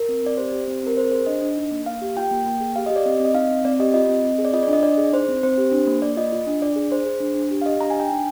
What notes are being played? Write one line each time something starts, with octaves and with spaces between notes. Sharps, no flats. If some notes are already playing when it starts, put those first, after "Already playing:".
Already playing: A#4
C4
C4 D5
G4 C5
G4
C4
C4 A#4
G#4 C5
G#4 C5
D4 D#5
D4
D#4
A#3
A#3 F5
G4
F4 G5
A#3
A#3
G#4
G4 F5
G4 D#5
D5
C4 D#5
C4
D#5
D#4 F5
C4
C4 D5
G4 D#5
F4 D#5
C4
C4
G#4
D5
F4 D#5
D5
D4
D#5
D4 D5
G#4
D#4 C5
C4
C4 C5
G4
D4
A#3
A#3 D5
F4 D#5
F4
D4
D4 D5
G#4
G#4 C5
G#4
D4
D4
G4
F5
G4 D#5
D4 A#5
G#5
D4 G5
D#4 G#5